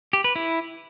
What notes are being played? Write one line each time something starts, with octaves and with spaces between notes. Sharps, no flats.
G4
B4
E4